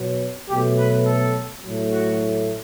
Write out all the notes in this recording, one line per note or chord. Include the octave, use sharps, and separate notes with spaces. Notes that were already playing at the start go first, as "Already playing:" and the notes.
Already playing: B2 F#3 B3
B2 F#3 A3 G4
B4
A4
A2 F#3 A3
F#4